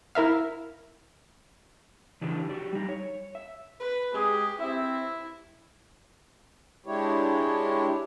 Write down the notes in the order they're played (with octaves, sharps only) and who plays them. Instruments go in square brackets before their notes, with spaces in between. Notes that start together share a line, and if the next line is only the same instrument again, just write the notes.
[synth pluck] E4 A#4 E5 F5
[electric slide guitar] C#3 E3 D4 D#4 G4
F#4 G4 D5
G3 D#4
C#5
E5
[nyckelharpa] B4
[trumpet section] G#3 G#4 D#6 [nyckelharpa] G4
[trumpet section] C4 E5 [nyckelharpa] E4
[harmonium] G#3 D4 E4 G4 C#5